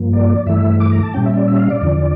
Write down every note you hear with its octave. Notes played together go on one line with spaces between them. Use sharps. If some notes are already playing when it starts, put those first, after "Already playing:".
Already playing: G2 F3 A#3
D5
G2 E3 A3 E5
D6
A#5
A5
A#2 G3 C#4 G5
E5
D5
E5
F5
D5
E2 D3 F3